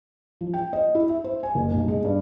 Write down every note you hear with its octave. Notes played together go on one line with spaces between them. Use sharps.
F3
G5
D#5
E4
E5
C5
G#5
F#1
B1
G#3
G2